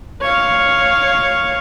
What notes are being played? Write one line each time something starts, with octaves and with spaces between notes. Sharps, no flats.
C#5 F5